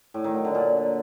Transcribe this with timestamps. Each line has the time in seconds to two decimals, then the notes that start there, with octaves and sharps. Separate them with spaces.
0.14 A2
0.24 D#3
0.34 F#3
0.45 D3
0.55 A#2